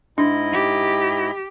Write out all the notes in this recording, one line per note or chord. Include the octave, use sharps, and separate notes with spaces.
G#2 D4 E4 D#5
G4